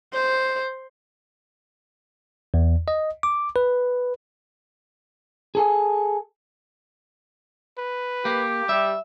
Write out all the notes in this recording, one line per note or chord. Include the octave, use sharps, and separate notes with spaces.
C5
E2
D#5
D6
B4
G#4 A4 G#5
B4
A#3 G4
G3 E5